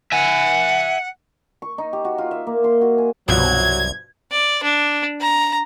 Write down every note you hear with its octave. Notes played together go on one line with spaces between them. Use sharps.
E5 F#5 G#5
C#6
D#4
G4
F#4
F4
E5
A#3
C6
F#4
G#5
C2 G2 B2 F3 F#3 G#6
D5
D4
A#5